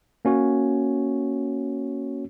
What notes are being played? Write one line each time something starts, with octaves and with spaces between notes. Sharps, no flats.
A#3 C#4 F#4 C#5